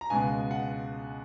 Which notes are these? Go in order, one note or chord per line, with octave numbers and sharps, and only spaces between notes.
A#5
C#2 B2 G#3 G#5
F#5